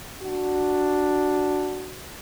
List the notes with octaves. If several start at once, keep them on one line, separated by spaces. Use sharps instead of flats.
D4 F#4